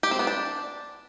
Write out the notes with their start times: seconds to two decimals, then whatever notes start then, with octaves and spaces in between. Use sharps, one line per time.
0.03 G4
0.11 C4
0.19 B3
0.27 D4